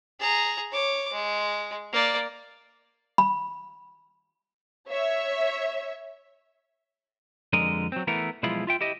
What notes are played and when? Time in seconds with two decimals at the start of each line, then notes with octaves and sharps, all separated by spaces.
0.20 G#4 A#5
0.71 C#5 D6
1.13 G#3
1.93 A#3 D5
3.18 B5
4.89 C#5 E5
7.53 F2 D3 G#3 A#4 D#5
7.92 F#3 C4
8.07 E3 A3 B3 A#4
8.43 B1 F3 G#3 E4 F4 B5
8.67 F4 E5 G5
8.81 E4 G4 D#5